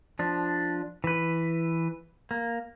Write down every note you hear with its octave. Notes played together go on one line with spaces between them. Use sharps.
F3 D4
E3 B4
A#3